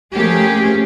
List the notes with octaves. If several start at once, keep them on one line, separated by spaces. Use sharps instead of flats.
F3 A3 A#3 C#4 G4 G#4